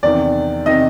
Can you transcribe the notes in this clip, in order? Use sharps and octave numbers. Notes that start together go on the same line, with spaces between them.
E2 C3 D#3 D5
C3 D#3 D#5